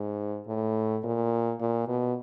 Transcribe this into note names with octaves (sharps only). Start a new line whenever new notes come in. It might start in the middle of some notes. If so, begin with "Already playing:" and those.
Already playing: G#2
A2
A#2
A#2
B2